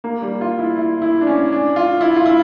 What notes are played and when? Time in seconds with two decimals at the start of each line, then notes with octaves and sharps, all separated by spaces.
0.04 A#3
0.22 G3
0.41 F4
0.59 E4
0.77 E4
1.02 E4
1.21 D4
1.27 C#4
1.52 D4
1.76 F4
2.01 E4
2.16 F4
2.26 E4